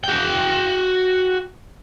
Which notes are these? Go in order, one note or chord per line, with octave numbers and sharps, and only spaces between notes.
F#4 G5